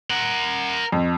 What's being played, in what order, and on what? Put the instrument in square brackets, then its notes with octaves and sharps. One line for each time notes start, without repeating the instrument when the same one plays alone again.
[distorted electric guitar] A#4 F#5
[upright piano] F2